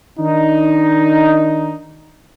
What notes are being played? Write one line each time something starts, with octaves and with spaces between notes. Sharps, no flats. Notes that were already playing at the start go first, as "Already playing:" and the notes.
D#3 D4 D#4